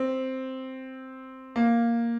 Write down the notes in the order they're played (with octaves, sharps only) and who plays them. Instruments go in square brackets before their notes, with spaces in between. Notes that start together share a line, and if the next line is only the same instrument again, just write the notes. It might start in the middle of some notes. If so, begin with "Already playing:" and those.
Already playing: [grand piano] C4
A#3